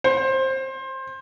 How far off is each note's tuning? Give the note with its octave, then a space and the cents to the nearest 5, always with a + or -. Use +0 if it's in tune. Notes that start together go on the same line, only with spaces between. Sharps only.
C5 +20